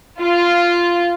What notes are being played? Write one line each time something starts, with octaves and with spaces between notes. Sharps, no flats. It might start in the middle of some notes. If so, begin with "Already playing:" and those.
F4